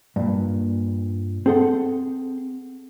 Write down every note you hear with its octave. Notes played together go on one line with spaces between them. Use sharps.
G2 A#2
C4 G#4 A4 F5 F#5 C6